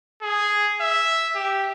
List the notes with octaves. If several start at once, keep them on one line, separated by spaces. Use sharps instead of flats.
G#4
E5
G4